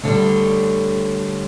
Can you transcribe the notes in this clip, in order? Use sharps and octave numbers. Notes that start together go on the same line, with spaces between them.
D2 D3 G3 C#5